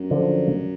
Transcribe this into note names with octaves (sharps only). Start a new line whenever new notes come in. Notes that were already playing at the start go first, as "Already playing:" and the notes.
Already playing: F#2
D3 F3